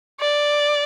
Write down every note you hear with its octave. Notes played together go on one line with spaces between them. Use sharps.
D5